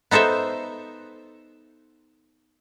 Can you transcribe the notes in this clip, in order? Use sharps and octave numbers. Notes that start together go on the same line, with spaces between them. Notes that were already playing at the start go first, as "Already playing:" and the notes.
B3 D#4 A4 C5 E5